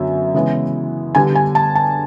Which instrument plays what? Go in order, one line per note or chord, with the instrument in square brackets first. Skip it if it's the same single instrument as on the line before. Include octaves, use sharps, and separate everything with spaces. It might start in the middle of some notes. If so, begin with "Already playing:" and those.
Already playing: [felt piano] F#2 D3 F#3 B3 E5
C#3 E3 G#3 B3 E4
D3 G3 B3 D4 G#5
G#5
A5
A5